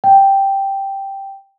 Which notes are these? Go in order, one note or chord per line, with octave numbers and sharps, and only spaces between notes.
G5